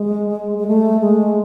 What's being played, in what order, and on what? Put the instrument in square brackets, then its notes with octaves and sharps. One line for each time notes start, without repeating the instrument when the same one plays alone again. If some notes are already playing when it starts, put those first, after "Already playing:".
Already playing: [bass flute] G#3
G#3
A3
G#3